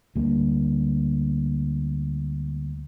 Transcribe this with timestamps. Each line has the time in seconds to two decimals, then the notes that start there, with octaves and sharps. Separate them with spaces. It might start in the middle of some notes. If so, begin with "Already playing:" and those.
0.16 D2 G3 A#3